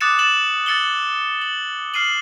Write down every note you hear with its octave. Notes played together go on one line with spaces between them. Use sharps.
D6 D#6 F#6 A6 C#7 E7
A6 E7 F#7
E6 A6 C#7 F#7 G7
F#7
F6 C7 D#7 F#7